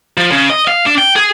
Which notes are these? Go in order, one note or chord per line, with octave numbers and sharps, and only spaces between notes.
F3
C#3
D#5
F5
D4
G5
G#4